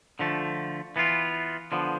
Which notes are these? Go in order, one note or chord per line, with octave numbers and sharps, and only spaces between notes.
D3 F3 A3
E3 B3 F4
D3 F3 B3